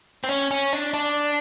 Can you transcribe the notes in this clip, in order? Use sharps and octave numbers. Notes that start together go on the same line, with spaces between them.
C4
C#4
C#4
D4
D4